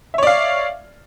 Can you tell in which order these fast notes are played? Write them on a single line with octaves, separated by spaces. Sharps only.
E5 C#5 D5 F5